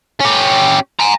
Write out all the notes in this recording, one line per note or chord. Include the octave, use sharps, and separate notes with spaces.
C#4 G4
G#5 A#5